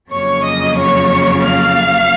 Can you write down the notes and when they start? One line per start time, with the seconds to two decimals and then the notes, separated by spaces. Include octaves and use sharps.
0.10 F2 C#3 F#3 A#3 C#5 C#6
0.43 D#5 D#6
0.77 C#5 C#6
1.44 F5 F6